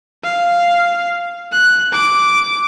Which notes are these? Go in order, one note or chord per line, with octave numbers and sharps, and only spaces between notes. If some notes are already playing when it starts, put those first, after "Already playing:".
F5
F#6
D6